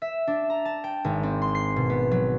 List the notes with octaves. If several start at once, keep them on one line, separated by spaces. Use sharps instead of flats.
E5
D4
A#5
A5
G5
G#1
C4
C6
C7
B2
B3
F#3